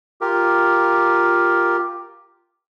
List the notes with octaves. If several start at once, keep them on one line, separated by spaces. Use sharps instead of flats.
F4 G4 A#4